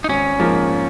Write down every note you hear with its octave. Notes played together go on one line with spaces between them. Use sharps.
D#4
G#1 C#4
G#2 F3 A#3